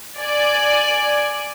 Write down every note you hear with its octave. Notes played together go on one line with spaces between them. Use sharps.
D5 G#5